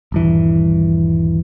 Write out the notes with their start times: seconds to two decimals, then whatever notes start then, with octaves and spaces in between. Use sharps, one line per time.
0.12 D#1 G2 E3